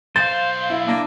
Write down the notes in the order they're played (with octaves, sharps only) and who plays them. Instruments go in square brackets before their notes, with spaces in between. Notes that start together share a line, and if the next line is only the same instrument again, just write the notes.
[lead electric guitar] B1 F5 [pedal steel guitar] C5 [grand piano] A6
[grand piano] E4
[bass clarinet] A#3 [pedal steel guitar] D4